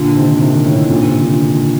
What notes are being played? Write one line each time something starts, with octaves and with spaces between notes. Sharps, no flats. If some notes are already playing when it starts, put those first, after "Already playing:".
Already playing: A#2 D3
C3 D#3
C3 D#3
A2 C3
A#2 D3
C3 D#3
D3 F3